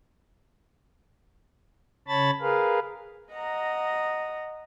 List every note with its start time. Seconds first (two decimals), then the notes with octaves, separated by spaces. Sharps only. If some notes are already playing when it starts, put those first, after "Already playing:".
2.08 C#3 C#5 A5 B5 A6
2.41 G#4 A#4 B4 F5
3.32 D#5 F#5 A#5